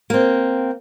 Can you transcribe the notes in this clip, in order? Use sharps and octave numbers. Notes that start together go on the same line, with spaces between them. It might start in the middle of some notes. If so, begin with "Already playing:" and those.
A#3 C4